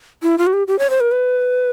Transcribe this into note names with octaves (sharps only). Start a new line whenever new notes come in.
E4
F4
F#4
G4
G4
C#5
C5
A#4
B4